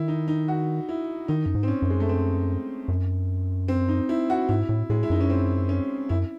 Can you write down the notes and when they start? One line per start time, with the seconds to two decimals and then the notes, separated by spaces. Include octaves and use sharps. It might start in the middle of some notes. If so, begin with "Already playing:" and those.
Already playing: D#3 E4
0.08 D#4
0.28 D#4
0.48 F#4
0.89 E4
1.28 D#3 D#4
1.46 F#2
1.55 G#2
1.63 C4
1.68 C#4
1.82 F#2
1.90 G#3
2.00 A3
2.09 C4
2.88 F#2
3.68 C4
3.88 D#4
4.09 E4
4.30 F#4
4.49 G#2 E4
4.69 A2
4.90 A2 G#3
5.03 E4
5.10 F#2 D#4
5.21 C#4
5.30 C4
5.69 C#4
6.09 F#2 E4